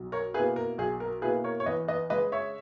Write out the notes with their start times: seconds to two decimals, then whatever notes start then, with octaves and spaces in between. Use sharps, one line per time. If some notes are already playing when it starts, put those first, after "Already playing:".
Already playing: B1
0.12 A#4 C#5
0.34 B2 A#3 E4 G#4 B4
0.56 A#4
0.78 B1 G#4
1.00 A#4
1.22 B2 A#3 E4 G#4 B4
1.44 A#4 C#5
1.60 C#5
1.66 E2 B4 D#5
1.88 B4 D#5
2.10 C#3 G#3 B4 D#5
2.32 C#5 E5